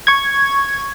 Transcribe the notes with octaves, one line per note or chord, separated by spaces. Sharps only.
C#6 G#6